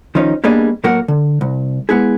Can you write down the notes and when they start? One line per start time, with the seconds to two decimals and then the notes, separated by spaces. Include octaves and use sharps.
0.15 D#3 F3 C#4 D#4
0.44 G3 A#3 B3 D4 G#4 D#5
0.84 A2 F#3 A#3 F#4 A#4 F#5
1.08 D3
1.41 C2
1.89 G#3 B3 E4 G#4